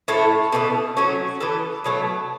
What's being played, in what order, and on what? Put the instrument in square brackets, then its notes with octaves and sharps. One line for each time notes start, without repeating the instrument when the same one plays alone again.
[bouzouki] A2 A3 E4
B2 B3 F#4 A4
F#3 A3 C#4 F#4
E3 B3 A4
B2 F#3 A3